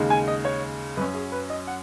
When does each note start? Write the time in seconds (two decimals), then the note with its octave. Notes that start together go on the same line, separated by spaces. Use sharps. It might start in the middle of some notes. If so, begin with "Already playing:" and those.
Already playing: D#2 C#3 G#3
0.10 G#5
0.28 D#5
0.45 C#5
0.97 F#2 F#3 C#4 B4
1.14 G#4
1.32 B4
1.50 D#5
1.67 F#5